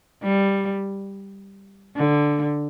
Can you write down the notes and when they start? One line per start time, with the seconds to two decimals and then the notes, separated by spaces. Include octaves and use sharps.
0.23 G3
1.97 D3